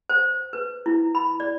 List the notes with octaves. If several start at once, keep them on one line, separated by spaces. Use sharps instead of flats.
C5
B4
E4
B5
D5